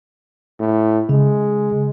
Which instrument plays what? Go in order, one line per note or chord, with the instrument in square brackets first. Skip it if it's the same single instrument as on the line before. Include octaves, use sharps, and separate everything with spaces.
[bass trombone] A2
[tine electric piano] C#3 [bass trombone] G#3